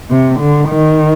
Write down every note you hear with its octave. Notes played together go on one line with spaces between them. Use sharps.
C3
D3
D#3